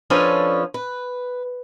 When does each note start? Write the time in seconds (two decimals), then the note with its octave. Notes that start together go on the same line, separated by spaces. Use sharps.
0.10 F3 C#4 D4 A4 B4 C#5
0.74 B4